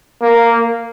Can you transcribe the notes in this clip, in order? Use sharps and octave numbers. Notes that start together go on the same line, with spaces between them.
A#3